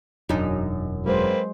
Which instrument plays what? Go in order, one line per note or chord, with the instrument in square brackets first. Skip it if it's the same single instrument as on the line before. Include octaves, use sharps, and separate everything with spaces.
[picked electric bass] E1 D4 [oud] F#2 D#4
[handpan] F#3 G#3 C5 [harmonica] A#3 C4 B4